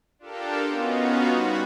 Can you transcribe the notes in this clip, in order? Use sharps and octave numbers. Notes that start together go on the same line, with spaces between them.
D4 F4 G4 A4 A#4
B3 C#4 D#4 F4 F#4
G3 F#4 B5